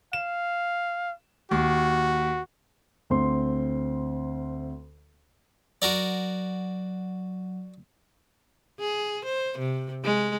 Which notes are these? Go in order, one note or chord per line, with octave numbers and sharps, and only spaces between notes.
F5 E7
D#2 F#4
D2 C4 C6
F#3 F#4 A#4 D5
G#4
C5
C3
G#3